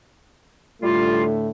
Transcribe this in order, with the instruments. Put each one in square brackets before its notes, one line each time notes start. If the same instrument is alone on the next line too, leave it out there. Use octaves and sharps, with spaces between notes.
[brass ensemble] A2 D3 A3 [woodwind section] G3 F4